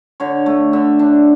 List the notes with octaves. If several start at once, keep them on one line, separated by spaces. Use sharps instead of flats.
D3 C#5
A3
D3 E5
D4